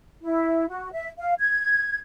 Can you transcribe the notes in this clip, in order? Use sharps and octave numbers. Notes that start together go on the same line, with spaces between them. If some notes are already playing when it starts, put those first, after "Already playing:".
E4
F#4
E5
F5
G#6